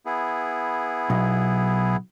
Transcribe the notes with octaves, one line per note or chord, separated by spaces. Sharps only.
B3 E4 G#4
B1